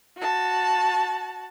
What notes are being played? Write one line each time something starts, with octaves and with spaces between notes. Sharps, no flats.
F#4 A5